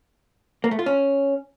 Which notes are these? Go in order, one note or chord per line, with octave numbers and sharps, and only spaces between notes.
A#3
A3
F4
C#4